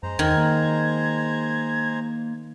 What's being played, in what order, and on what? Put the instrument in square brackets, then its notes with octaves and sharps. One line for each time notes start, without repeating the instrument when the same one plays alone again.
[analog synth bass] F#2 [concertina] G#3 C5 A#5
[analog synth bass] E2 [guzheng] D#3 [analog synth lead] G#6
[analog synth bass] A#3